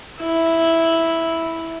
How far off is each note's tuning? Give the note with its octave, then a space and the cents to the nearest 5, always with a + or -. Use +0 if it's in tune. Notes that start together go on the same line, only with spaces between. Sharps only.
E4 -5